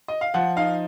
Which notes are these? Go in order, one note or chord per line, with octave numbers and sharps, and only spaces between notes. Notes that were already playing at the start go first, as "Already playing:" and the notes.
D#5
F5
F3 F#5
D#4 F5